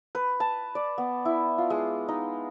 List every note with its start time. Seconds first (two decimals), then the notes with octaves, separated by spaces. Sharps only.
0.15 B4
0.40 A5
0.75 D5
0.98 B3
1.25 E4
1.58 F4
1.70 G#3
2.08 D#4